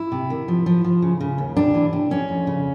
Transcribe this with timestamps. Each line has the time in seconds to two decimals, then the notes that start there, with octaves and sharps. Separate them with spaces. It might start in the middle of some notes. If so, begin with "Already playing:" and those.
Already playing: E4
0.12 C3
0.30 D#3
0.48 F3
0.66 F3
0.84 F3
1.02 C#3
1.21 C#3
1.38 D#2
1.56 C3 D4
1.74 E3
1.93 C3
2.10 F2 C#4
2.29 F2
2.47 C#3